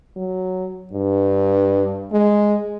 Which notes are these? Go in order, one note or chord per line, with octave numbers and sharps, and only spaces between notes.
F#3
G2
G#3